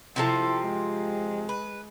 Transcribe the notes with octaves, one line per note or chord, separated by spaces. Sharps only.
C3 F3 C4 E4 A4
G#3
B4